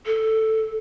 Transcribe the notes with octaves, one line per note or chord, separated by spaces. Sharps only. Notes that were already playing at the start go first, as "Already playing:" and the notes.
A4